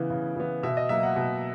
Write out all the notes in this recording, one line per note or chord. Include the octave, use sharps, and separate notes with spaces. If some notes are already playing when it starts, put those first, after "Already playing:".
Already playing: C#3 E3 B3
C#3
E3 B3
B2 E5
D#5
F#3 A#3 E5
F#5
B2